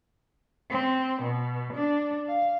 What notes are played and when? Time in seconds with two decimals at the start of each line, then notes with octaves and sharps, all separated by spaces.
0.71 C4
1.23 B2
1.74 D4
2.28 F5